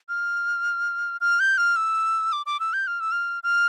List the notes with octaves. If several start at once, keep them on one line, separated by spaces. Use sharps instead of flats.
F6
F6
G6
F6
E6
D6
D6
E6
G6
F6
E6
F6
F6